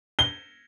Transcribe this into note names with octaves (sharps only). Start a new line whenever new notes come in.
G7